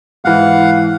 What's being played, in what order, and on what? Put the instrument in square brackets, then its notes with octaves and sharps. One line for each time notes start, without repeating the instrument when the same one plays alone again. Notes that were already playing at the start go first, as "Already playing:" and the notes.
[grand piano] G#2 E3 [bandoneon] F5 F#5